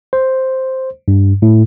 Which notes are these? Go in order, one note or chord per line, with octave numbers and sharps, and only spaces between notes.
C5
G2
A2